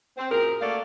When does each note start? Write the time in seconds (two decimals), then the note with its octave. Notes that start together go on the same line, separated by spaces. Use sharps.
0.17 C4
0.31 F#2 A#2 G#4 A#4
0.61 A3 A#3 F#4 A4 D5 F5